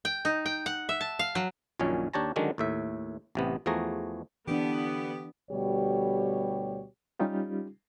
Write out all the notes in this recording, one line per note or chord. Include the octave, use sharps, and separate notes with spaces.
G5
D#4
G5
F#5
E5
A5
F5
F#3
A#1 F#2 A#2 D#3 C#4 C#5
D#2 D4 G4 C#5 A5 A#5
D3 D#3 F#3 G#3 C#4 D4
D#2 A2 E5
A1 C3 B3
E2 F3 A3 F#4 G#4 A#5
D3 E3 B3 D4 G4
D2 B2 G3 G4 C#5
G3 C#4 D#4 F4 G4